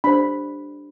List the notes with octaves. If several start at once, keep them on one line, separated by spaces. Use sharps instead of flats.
D4 G4 C5 B5